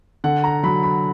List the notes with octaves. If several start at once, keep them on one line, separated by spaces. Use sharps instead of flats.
D3 F#5
A#5
F#3 B5
B5